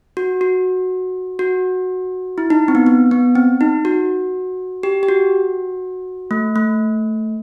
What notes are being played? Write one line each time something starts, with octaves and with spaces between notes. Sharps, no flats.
F#4
F#4
F#4
E4
D#4
C4
B3
B3
B3
C4
D#4
F#4
G4
G4
F#4
A3
A3